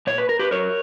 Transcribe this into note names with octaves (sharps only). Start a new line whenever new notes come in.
A#2 C#5
B4
A#4
G4 B4
F#3 A#4 C#5